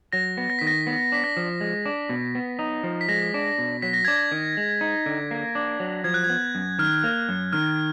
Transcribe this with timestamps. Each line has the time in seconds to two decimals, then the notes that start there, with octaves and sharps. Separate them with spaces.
0.13 F#3 A#6
0.38 B3
0.50 A#6
0.59 D#3 B6
0.67 A#6
0.87 B3
1.12 D4 B6
1.24 A#6
1.37 F3
1.61 G#3
1.86 D4
2.09 B2
2.35 B3
2.59 D#4
2.83 F3
3.01 B6
3.08 G#3 A#6
3.34 D4
3.58 B2
3.82 F#3 B6
3.93 A#6
4.05 D4 G#6
4.16 A#6
4.32 D#3
4.57 G#3
4.81 D#4
5.06 D3
5.31 A#3
5.55 D4
5.80 F#3
6.04 F3 G#6
6.14 F#6
6.24 G#6
6.30 B3
6.55 F#2
6.79 D#3 F6
7.04 A#3
7.29 F#2
7.53 D#3 F6